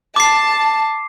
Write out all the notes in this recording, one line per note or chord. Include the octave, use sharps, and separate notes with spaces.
A5 D6 C7